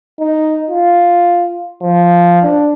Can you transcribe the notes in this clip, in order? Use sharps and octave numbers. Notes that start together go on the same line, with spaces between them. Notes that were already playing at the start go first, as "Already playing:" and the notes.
D#4
F4
F3
D4